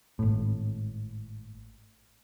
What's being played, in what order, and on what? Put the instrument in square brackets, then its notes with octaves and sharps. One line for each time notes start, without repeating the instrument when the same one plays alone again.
[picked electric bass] G#1 A2